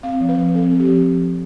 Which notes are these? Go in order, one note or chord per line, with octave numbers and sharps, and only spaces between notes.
C4 F5
F3
B4
F3
B4
C4 A4
C4
G4
F3